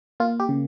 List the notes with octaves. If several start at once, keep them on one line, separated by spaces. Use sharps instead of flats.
A#3 F4
G4
C#3